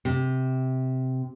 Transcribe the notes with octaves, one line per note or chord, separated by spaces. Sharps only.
C3